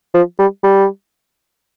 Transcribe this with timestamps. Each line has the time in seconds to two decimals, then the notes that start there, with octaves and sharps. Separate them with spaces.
0.14 F3
0.39 G3
0.63 G3